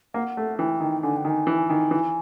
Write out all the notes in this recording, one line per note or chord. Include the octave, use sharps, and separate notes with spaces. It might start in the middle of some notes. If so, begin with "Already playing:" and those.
A#3 F#5
A3
E3 G5
D#3
D3 G#5
G5
D#3
G#5
E3
D#3
E3